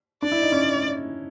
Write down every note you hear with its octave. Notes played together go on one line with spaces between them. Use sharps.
D4 D5
E4
D#4
C#4